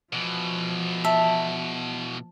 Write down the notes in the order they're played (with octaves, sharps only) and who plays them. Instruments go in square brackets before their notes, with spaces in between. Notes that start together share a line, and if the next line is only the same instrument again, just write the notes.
[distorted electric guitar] B2 E3 [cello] F3
[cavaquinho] E5 [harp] A5